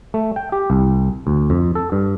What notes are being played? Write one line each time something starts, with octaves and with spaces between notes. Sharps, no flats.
A3
G5
G4
C2
D2
F2
A4
G2